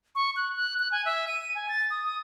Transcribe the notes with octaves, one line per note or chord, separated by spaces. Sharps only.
C#6
F#6
F#6
F#6
G#5
E5
D#7
G#5
A6
D#6
D#6